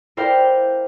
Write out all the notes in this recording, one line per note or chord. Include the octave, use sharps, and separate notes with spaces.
E4 A#4 C5 D5 F5 G5